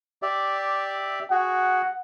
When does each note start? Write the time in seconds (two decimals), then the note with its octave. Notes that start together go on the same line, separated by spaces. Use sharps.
0.22 G4 D5 E5
1.31 F#4 G#4 F#5